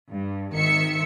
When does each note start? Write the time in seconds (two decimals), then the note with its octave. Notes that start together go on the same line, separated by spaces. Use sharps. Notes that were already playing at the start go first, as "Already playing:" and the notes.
0.10 G2
0.52 G#1 D#3 E5 C#7